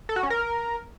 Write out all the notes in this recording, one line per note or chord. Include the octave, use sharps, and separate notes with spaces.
A4
F#4
C#4
A#4